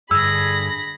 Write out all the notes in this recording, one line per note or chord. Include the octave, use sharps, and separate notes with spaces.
G2 D3 G#4 B5 E6 A#6